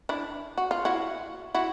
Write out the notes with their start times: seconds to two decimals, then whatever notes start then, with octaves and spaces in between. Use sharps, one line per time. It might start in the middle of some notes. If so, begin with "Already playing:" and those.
0.09 D4 E4
0.58 F#4
0.71 F4
0.85 E4 F#4
1.54 E4 F#4